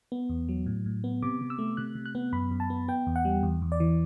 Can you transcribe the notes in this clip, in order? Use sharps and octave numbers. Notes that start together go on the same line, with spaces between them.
B3
E2
F#3
A2
A2
B3
C3 D6
C3
E6
A3
C3 F#6
C3
F#6
B3
F#2 B5
F#2
A5
B3
B3 G5
E2
F#5
G3
E2
E2
D5
E3